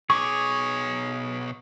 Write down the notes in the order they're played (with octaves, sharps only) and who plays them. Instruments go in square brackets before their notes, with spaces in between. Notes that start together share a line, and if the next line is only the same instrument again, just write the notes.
[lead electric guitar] B2 C#5 [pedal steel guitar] G#4 D6 [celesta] C#6